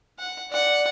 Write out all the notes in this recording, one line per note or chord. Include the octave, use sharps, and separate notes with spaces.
F#5
D5 F#5